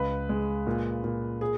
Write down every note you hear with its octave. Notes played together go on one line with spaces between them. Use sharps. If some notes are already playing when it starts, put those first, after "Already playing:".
Already playing: C#2 B4
G#3
A#2
A#2
G#4